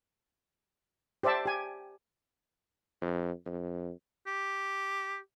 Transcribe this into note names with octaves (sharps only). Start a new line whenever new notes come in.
G4 C5 D5 E5 A5
G4 G#5
F2
F2
G4